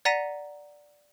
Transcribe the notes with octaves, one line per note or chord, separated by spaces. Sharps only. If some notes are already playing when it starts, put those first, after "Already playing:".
D5 F#5 A#5 A#6 B6 D#7